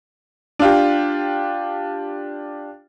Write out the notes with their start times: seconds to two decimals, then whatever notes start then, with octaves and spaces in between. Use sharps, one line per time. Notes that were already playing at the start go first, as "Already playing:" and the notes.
0.59 D4 F4 G4